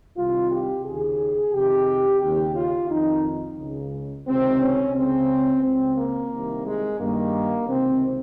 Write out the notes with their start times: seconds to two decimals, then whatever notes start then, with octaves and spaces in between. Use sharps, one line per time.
0.17 C2 C3 D#3 F4
0.52 G4
0.85 D#2 C#3 G#4
1.54 F2 C3 D#3 G4
2.22 D#2 C#3 G4
2.56 F4
2.90 F2 D#3 D#4
3.59 C#2 C#3
4.27 C#2 C3 D#3 C4
4.61 C#4
4.95 C#2 C#3 C4
5.63 C#2 C#3 C4
5.98 A#3
6.32 C2 C3 D#3
6.66 G#3
7.00 G2 D#3 A#3
7.68 C#2 C3 D#3 C4